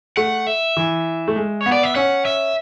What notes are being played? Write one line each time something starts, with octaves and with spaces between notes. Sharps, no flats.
A3 F#5
E5
E3
A3
G#3
C#5
B3
D5
E5
C#4 F#5
E5